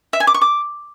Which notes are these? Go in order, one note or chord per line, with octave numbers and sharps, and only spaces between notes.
E5
G#5
D6
C#6
D6